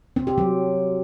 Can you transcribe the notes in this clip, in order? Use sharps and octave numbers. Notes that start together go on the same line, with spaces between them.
C4
G4
F#3